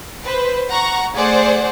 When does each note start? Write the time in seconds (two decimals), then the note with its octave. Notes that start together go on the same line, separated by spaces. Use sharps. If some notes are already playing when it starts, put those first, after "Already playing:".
0.25 B4 C5
0.71 F#5 A#5 C#6
1.16 A3 G#4 C5 D5 F#5